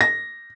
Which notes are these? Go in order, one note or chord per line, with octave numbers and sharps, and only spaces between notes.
A#6